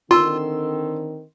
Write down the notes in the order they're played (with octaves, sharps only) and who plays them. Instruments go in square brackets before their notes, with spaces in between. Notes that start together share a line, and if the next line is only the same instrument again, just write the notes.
[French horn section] D3 D#3 C4 [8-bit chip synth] F4 [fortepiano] C6 E6